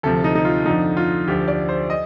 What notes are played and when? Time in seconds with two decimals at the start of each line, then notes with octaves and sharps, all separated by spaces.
0.03 D2 C3 F3 A4
0.24 D#4
0.35 D#4
0.45 F4
0.66 F2 D3 F3 D#4
0.97 F4
1.28 D2 D3 F3 G4
1.48 D5
1.69 C5
1.90 D#5